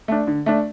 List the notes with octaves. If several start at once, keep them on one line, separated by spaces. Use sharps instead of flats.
A3 D4
D3
A3 D4